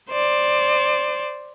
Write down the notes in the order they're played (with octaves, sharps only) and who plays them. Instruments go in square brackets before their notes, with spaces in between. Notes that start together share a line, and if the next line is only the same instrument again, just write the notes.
[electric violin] C5 D5